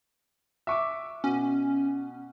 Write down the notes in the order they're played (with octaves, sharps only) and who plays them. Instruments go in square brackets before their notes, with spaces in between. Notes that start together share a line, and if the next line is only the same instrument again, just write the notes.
[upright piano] E5 C#6 D6
[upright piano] B2 [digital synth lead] C#4